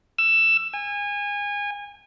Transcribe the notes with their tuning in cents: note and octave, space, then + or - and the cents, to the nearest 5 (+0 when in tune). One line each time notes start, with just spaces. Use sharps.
E6 +15
G#5 -25